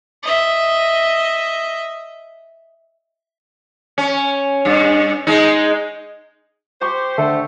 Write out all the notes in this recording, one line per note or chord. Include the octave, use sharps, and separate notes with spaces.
D#5 E5
C#4
G2
G#3 D#4
G4 C5 C#6
D3 A3